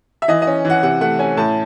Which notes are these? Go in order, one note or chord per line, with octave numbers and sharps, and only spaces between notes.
E5
E3 D#5
D#5
C#4
E3
F#5
C3 F#5
A3 F#5
C#4 G#5
A2 A5